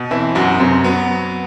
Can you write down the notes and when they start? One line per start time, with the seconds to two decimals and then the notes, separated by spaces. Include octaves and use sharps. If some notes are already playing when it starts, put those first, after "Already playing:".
Already playing: B2
0.11 E3 C4 E4
0.35 F#2 F#3 F#4
0.60 F#2 C3 C4
0.84 F#3 B3